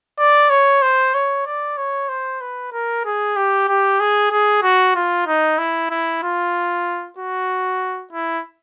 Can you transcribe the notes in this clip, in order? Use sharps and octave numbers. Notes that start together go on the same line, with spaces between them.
D5
C#5
C5
C#5
D5
C#5
C5
B4
A#4
G#4
G4
G4
G#4
G#4
F#4
F4
D#4
E4
E4
F4
F#4
E4